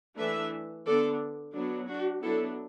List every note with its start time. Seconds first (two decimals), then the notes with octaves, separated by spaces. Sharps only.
0.18 E3 A3 D4 B4 E5
0.86 D3 B3 D4 A4 D5
1.54 F#3 B3 D4
1.88 D4 F#4
2.22 F#3 B3 D4 E4 A4